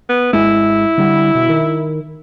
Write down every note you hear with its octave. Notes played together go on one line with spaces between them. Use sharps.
B3
G#1 G#3 E4
D3 G3
B2
D#3